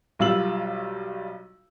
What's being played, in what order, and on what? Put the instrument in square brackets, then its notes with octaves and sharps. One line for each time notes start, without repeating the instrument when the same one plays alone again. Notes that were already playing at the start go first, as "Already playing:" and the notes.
[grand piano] B1 G3 F4 E6 F#7